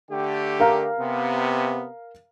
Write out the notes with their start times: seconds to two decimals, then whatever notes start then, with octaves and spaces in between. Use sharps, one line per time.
0.11 D3 A3 G4
0.60 A#4 F5 A#5
1.00 C3 B3